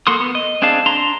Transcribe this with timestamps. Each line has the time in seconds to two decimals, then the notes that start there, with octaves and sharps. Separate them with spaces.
0.07 A#3 F#4 A4 C6 D#6
0.20 B3
0.35 D#5
0.62 C4 D4 G#4 F5 A5
0.86 D4 A#5 C6